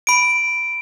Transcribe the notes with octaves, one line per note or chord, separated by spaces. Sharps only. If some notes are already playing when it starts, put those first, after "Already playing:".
B5 D7